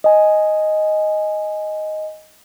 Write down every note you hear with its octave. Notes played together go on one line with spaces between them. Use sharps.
D#5 G#5